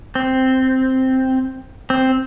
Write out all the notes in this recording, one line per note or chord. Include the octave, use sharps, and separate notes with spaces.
C4
C4